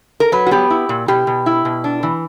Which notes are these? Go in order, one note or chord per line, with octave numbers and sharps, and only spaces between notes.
A#4
F#3 B4
F#4
B3 G4
E4
A#2
B2 G4
B2
E4
B2
D4
E3